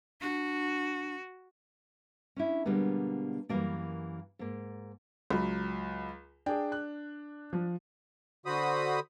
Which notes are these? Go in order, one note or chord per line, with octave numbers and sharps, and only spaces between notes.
D4 F#4
C#4 D4 E4
B2 D3 G3 G#3 A#3 B3
F#2 E3 F3 G3 A#3 D4
G#2 A#3
C#2 F#3 B5
D4 G#4 G5
F#6
F3
D3 F#4 C5 B5 D#6